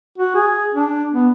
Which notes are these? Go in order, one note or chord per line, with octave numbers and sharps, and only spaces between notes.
F#4
G#4
D4
B3